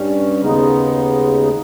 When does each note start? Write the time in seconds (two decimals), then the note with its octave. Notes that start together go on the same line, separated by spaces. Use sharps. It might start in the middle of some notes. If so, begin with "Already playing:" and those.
Already playing: G2 G3 C#4
0.41 D#2 C#3 G#3 B3 D#4